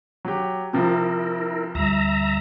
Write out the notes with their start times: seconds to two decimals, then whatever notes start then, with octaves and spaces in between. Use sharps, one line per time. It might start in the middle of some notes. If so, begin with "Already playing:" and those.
0.25 F#3 G4
0.73 C3 F3 E4 A#4
1.75 D2 G3 E5 A#5